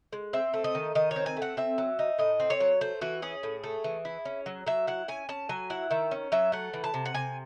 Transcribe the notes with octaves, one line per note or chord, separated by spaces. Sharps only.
G#3
C4 E5
A3
D#5
D#3
D#3 D#5
C#5
C4
G#5
A3
F#5
C4 E5
F#3
D#4
A2 D#5
C4
C#5
F#3
A3 C5
E3 F#4
C#4 G#4
A2
A3
E3
E4
C#4
F#3
F#3 E5
E4 F#5
C#4 G#5
C#4 A5
F#3 G#5
E4 F#5
D#3 E5
C#4
F#3 E5
A3 F#5
E3
A5
C3
F#5
C3 G#5